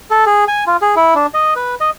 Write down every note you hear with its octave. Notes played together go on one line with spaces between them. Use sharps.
A4
G#4
G#5
F4
G#4
E4
D4
D#5
B4
D#5